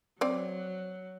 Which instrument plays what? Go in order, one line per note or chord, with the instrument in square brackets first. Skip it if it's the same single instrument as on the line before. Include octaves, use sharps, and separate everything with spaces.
[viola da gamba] F#3 [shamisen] C4 D5